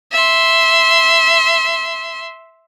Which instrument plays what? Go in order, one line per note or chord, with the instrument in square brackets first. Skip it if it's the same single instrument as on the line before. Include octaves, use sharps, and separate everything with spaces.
[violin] E5 C6